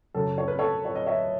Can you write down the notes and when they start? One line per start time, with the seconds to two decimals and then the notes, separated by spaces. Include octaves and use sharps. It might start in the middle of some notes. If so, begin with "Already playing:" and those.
0.14 F#2 C#3 F#3 C#4 A4
0.38 C#5
0.48 B4
0.59 A4 C#5
0.85 C#5
0.95 D#5
1.06 C#5 E5